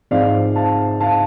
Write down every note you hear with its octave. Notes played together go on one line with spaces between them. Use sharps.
G#2 F3 G#3 C4 D5 F5
F5 A5
F5 A5